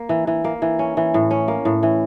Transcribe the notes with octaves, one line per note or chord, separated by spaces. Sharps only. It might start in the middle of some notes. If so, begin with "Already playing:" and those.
Already playing: A#3
E3
E3
A#3
E3
C#4
E3
A2
C#4
A#3
A2
E3